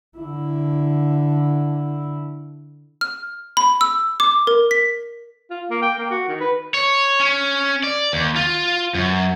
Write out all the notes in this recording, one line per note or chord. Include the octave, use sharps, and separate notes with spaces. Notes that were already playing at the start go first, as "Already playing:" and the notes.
D3 E4
F6
B5
E6
D6
A#4
B6
F4
A#3
G5
A#3
F#4
D#3
B4
C#5
C#4
D5
D#2
F4
F#2